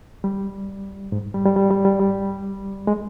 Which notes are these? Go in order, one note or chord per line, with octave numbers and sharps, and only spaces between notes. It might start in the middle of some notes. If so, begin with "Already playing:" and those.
G3
G#2
G3
G3
G3
G3
G3
G3
G#3